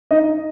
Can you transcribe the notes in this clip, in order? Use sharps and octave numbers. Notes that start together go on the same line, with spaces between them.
D#4 D#5